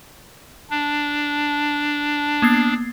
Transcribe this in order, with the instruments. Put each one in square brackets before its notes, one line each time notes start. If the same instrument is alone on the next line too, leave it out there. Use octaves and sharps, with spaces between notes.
[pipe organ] D4
[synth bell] A#3 B3 C7